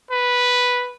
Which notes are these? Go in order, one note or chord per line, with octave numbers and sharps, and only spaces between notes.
B4